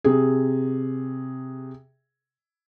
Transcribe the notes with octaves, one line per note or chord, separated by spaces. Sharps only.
C3 G#4